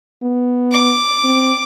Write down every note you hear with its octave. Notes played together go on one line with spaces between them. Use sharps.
B3
D6
C4